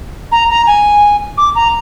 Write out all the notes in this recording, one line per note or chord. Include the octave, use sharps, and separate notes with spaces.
A#5
A#5
G#5
D6
A#5